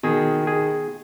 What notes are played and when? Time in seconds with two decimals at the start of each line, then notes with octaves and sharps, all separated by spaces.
0.03 B2 D#3 G#4
0.47 G#4